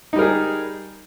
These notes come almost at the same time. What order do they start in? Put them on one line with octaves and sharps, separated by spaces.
D#4 G3 A#4 G#4